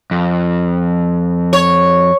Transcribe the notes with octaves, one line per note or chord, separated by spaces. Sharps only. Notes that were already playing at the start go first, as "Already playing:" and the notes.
F2
C#5